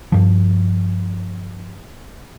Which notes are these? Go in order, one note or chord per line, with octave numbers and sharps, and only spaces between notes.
G2 F3